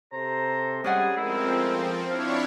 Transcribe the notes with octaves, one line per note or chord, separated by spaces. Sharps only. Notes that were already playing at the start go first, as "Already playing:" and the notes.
C3 A4 C5 A#5
G3 G#3 C#4 G#4 D5 F#5
F3 G#3 A3 C4 E4 A#4
D4 E4 C#5 F5